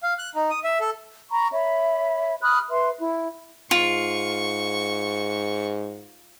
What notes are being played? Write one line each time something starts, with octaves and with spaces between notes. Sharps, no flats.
F5
F#6
D#4
D#6
E5
A4
A#5 B5 C#6
C#5 E5 B5
B5 D#6 F6 F#6
B4 E5 C6
E4
G#2 F4 C#6